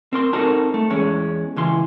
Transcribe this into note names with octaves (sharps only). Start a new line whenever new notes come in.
C4 A#4 C6
C4 D#4 F#4 A4 A#4 C5
A3
E2 G#3 C#4
C#2 E3 C6